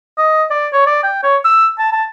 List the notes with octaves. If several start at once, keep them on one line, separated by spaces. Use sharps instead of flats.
D#5
D5
C#5
D5
G5
C#5
E6
A5
A5